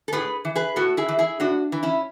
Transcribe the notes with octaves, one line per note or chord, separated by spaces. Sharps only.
A4
A2 G#4 B4
E3
G#4 B4
A2 F#4 A4
E4 G#4
E3
E4 G#4
A2 D4 F#4
E3
C#4 E4